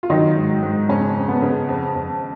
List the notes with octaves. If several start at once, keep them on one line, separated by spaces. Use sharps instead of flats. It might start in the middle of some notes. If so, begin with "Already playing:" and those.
F4
D#3 F#3 D#4
G#2
G#2
F2 C#3 C#4
F2
B3
C#3
F2
F2